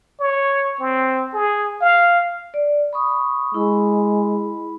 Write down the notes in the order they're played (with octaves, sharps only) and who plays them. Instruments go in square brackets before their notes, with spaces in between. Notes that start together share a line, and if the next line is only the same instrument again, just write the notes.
[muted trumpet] C#5
C4
G#4
F5
[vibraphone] D5
B5 C#6 D#6
[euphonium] G#3 [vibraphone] E4 B5